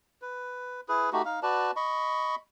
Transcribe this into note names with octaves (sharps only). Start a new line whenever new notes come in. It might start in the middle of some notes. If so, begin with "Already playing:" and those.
B4
E4 G#4 B4
A3 D#4 F#4 G4
D#4 F5
F#4 B4 D5 A5
D#5 B5 C#6